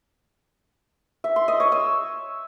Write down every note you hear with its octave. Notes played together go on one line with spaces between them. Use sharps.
E5
C6
D#5
C#5
E6